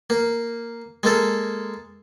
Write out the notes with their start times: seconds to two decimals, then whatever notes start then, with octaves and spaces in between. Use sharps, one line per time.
0.10 A#3
1.03 G#3 A#3 A4